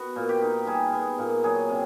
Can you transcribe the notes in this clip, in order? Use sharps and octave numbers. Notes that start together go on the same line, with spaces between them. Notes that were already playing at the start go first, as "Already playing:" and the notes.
Already playing: B3 F#4
A#2
G4
D#4
G3 G#4
B3
A#2
F#3 G#4
C3